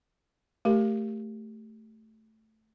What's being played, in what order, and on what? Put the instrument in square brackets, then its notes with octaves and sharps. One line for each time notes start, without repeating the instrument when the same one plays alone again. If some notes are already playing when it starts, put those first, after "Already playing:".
[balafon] A3 G4 A#4